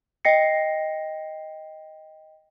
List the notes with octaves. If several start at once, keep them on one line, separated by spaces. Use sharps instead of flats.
D#5 G5 A#6 C7 C#7